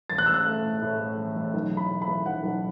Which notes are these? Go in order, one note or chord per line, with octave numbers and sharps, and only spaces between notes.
A1 A6
F#6
A1 E6
F#6
A3
A2
A2
A3
A1
A1
B1
E3
B5
B1
B5
E3
B1 F#5
B1